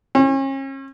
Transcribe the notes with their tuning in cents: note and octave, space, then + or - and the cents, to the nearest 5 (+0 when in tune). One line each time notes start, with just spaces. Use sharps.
C#4 -40